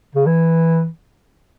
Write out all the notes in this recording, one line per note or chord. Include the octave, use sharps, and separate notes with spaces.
C#3
E3